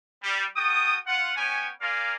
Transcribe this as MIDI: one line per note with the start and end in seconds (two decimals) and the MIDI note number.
0.23 0.45 55
0.56 0.95 66
0.56 0.95 69
0.56 0.95 79
0.56 0.95 87
1.06 1.32 65
1.06 1.32 78
1.36 1.68 59
1.36 1.68 61
1.36 1.68 73
1.36 1.68 79
1.36 1.68 80
1.81 2.16 58
1.81 2.16 65
1.81 2.16 74
1.81 2.16 77
1.81 2.16 80
1.81 2.16 82